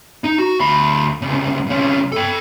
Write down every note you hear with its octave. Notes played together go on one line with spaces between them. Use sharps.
D#4
F#4
D2 B5
C2 C#3
C2 C#4
A4 G5